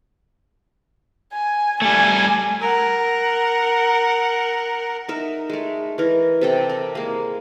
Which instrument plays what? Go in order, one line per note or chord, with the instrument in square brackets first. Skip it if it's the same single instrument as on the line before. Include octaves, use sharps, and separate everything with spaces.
[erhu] G#5
[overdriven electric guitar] G3 A3 [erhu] G#5
[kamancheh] A#4 F#5
[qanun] D#4 A#4 E5
G#3 A3
E3 A#4
C3 A4 G5
A#4
G#3 A#3